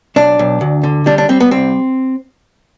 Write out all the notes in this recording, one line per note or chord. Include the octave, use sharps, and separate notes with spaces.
B1 D4
B1
D2
D3
G3 D4
D4
G3 C4
B3
C2 C4